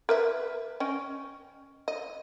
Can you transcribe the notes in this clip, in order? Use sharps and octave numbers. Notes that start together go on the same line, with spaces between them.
A#4 B4 E5
C#4 D#5 G5
D#5